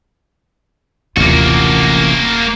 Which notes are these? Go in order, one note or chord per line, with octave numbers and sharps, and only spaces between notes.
D#1 A1 C3 F3 A#3 F4 F#4